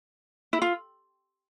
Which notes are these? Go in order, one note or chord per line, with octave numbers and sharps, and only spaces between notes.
E4
F4